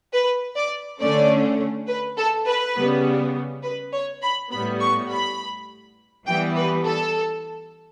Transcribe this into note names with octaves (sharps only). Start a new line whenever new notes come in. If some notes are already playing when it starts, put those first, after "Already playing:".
B4
D5
D3 A3 C#4 D5
B4
A4
B4
C#3 G3 B3
B4
C#5
B5
A2 G3 B3 B5
C#6
B5
E3 G3 B3 G5
B4
A4